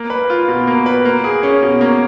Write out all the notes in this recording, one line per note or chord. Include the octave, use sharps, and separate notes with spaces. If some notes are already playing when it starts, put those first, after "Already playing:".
Already playing: A#3
B4
F4
B2
A#3
B4
A#3
G#4
C#4
B2
A#3